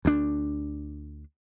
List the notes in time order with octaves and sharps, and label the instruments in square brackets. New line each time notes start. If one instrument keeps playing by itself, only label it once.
[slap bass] D2 D4